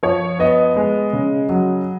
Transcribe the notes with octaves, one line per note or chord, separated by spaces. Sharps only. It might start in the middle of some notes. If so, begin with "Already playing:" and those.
F3 C#5
B3 D#5
G#3
C#3
F#3